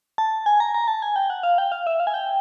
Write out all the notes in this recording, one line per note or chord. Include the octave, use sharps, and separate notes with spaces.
A5
G#5
A#5
A#5
A5
G#5
G5
F#5
F5
G5
F5
E5
F5
G#5
G5